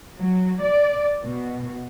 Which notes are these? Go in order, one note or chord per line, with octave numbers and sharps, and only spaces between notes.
F#3
D5
B2